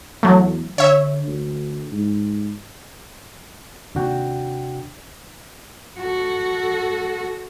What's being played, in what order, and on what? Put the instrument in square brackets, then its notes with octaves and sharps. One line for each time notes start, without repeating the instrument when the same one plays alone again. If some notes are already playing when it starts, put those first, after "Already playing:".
[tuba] E2 [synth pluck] F#3 A3
[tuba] D3 [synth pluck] C#5 E5
[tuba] D2
G#2
[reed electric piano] D#2 C3 D4 F#4 F#5 G5
[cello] F#4 A4